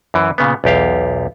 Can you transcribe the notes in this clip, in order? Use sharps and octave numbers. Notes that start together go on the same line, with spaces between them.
F#2 E3
A#2 C#3 B3
B1 E2 G4 F5